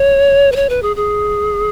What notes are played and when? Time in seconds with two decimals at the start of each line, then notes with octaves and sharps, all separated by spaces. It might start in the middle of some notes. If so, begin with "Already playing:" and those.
Already playing: C#5
0.52 B4
0.56 C#5
0.69 B4
0.83 G#4
0.96 G#4